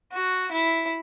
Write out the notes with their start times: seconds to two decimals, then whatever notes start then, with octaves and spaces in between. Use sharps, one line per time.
0.13 F#4
0.52 E4